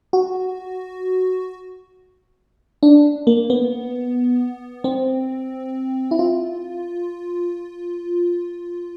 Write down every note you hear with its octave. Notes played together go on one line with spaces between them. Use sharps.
F#4
D4
A#3
B3
C4
E4
F4